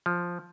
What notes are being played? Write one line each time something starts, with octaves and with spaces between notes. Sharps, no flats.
F3